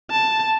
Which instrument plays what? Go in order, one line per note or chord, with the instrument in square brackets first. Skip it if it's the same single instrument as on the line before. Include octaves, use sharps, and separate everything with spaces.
[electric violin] A5